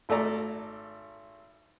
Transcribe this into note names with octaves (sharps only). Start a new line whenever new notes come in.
G#1 A3 A4 D5 A#5